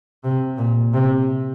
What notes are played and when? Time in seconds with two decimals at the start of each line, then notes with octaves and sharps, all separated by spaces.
0.24 C3
0.58 A#2
0.94 C3